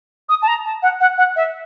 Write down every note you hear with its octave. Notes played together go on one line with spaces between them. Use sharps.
D#6
A5
A#5
A5
F#5
F#5
F#5
E5